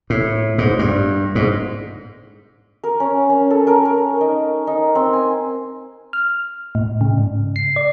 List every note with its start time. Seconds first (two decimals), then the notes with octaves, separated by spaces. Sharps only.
0.10 A2
0.58 G#2
0.79 G2
1.35 G#2
2.84 A#4
3.00 C#4
3.29 C#4
3.51 A4
3.67 A#4
3.85 A#4
4.21 D#4
4.67 D#4
4.95 C4
5.13 G#5
6.13 F6
6.75 A2
7.01 C#3
7.18 G#2
7.56 C7
7.76 D5